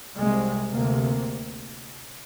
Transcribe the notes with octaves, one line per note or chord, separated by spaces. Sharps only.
C2 C3 G#3
D2 C3 A#3